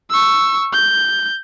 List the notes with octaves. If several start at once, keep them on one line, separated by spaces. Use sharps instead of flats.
C#6 E6
G6